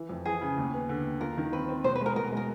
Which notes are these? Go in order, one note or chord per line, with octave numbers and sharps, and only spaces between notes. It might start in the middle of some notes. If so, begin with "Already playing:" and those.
Already playing: E3
F2
E3 G#4
C#3
D#2
B3
D3
D#2
F4 A#4
D#3
C4 B4
C4
B2 C5
B4
G#3
A#4
B2 A#4
G#3 A#4